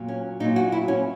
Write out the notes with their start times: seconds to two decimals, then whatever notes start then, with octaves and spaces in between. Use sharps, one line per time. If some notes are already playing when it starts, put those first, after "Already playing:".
Already playing: A#2 F#3
0.08 C#4
0.40 A#2 D#4
0.44 F#3
0.56 F#4
0.72 E4
0.88 C#4